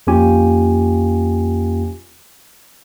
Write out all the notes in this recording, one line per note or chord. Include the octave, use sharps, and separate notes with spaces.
F2 A#3 C#4 F4 G4 G#5